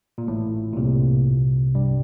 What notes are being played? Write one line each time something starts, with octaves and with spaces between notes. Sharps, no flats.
A#2
A1 A2
A#2
C2 C3
G2 G3